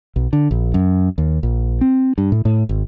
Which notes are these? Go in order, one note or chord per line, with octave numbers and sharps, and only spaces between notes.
B1
D3
A#1
F#2
D#2
A#1
C4
G2
A2
A2
G#1